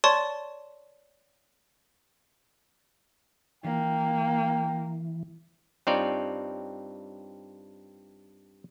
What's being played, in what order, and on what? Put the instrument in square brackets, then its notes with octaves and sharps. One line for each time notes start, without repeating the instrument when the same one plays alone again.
[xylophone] C#5 D5 A5 C6 C#6
[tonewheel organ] E3 [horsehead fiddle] A#3 [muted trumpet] G5
[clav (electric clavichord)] G2 C4 D#4 F4 C#5 D5